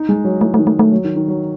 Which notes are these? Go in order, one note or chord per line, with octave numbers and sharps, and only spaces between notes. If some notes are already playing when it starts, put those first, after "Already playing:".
Already playing: D#4
G#3
F#3
E3 A3
A3
D#3
A3
A3
F#3
D#3
D#3
F#3